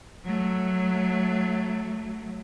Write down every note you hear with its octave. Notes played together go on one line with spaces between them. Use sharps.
F#3 A3